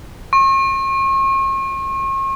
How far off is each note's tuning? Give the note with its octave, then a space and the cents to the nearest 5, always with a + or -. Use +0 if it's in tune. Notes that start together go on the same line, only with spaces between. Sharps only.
C#6 -40